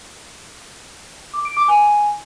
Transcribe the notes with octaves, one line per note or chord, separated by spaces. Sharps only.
D6
D7
D6
G#5